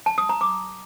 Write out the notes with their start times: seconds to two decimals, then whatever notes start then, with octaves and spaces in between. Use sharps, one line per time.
0.06 A5
0.18 D#6
0.29 A#5
0.41 D6